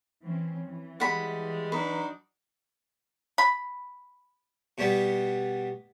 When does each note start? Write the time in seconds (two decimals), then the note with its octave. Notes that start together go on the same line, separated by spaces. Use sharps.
0.23 E3 C4 C#4
0.66 E3
1.00 G3 G#3 F#5 B5
1.72 F#3 D4 D#4 B4
3.38 B5
4.78 B2 G3 B3